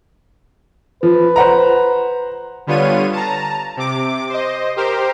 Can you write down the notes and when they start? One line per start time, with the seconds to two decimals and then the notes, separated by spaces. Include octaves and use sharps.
1.03 F3 B4
1.36 C5 F#5 A#5
2.67 D3 G3 B3 F4 C#5 D#7
3.13 A5 A#5
3.77 C3 D6
4.29 C5 D#5
4.76 G4 A#4 C5